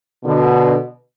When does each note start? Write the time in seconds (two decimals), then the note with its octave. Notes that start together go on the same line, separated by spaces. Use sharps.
0.24 B2 D3